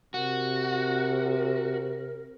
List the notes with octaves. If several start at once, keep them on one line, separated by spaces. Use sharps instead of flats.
C3 F#4 A#4